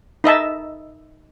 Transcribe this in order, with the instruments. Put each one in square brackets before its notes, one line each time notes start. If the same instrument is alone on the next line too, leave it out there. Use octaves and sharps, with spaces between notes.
[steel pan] D#4 D#5 E5 A5